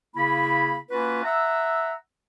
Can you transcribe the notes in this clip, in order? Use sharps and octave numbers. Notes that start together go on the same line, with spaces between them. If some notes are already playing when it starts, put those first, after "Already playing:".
C#3 A#3 E4 B5
A#3 C#4 F4 F#4 B4
E5 F#5 A#5 E6